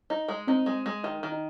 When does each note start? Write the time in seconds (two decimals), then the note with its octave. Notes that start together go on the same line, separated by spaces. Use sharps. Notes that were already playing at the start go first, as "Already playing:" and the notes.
0.10 D#4
0.28 G#3
0.47 C4 D#4
0.66 G#3
0.86 G#3
1.03 D#3 D#4
1.23 D#3
1.32 D#4